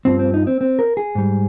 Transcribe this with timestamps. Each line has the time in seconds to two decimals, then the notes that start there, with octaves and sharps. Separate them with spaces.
0.05 G2 F3 C4
0.19 C4
0.34 D#4
0.47 C4
0.61 C4
0.79 A#4
0.97 G#4
1.15 G#2 G3